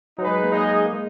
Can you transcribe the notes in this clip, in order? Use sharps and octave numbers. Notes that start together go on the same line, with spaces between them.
F#3 D#4 G#4 B4
G#3
A#3
G#3 D#4 G#4 D#5
A#3
G#3